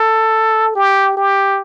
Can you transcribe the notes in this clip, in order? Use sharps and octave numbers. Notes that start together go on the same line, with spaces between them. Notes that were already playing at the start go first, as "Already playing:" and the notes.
Already playing: A4
G4
G4